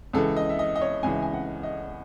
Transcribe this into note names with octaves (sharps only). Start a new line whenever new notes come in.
C#2 C#3 E3 A4
D#5
E5
D#5
D#5
C#5
C#2 C#3 E3 G#5
G#5
F#5
D#5